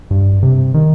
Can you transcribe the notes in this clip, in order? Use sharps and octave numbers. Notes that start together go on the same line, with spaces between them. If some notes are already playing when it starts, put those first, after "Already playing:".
G2
C3
D#3